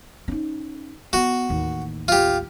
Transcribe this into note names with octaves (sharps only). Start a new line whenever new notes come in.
C#4 D#4
B3 F#4
A1 D#2
F4 G4